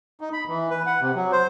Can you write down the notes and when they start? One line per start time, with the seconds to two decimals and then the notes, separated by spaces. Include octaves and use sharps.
0.21 D#4
0.33 B5
0.48 E3
0.70 B4
0.86 F#5
1.01 C3
1.15 F#3
1.32 C5